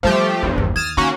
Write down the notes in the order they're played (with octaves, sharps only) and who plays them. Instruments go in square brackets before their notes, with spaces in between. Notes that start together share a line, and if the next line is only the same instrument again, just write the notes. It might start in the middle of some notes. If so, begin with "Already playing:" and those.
[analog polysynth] F3 A3 G4 [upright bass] G3 F4 [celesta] C5
[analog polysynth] E2 G2 [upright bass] E3 D4
[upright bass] G1 D#2
[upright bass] D#2 [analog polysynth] D#6 F6 A6 [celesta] G#6 E7
[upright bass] D#3 [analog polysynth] A#3 C#4 F#4 [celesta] C#6